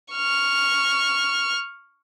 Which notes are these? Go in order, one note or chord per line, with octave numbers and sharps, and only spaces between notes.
C#6 F6